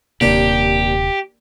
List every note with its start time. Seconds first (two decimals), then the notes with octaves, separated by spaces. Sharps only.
0.21 D#1 D#2 C3 D4 G4